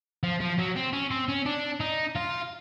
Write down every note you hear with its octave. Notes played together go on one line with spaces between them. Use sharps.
F3
F3
F#3
C4
C#4
C4
C#4
D4
D#4
F4